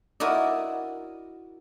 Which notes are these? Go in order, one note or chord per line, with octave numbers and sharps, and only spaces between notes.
E4 F#4 A#4 D5 D#5